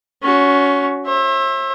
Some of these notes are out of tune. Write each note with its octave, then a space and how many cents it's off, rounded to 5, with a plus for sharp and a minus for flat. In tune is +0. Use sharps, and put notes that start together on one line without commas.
C#4 +25 F#4 +0
C5 +45 E5 +0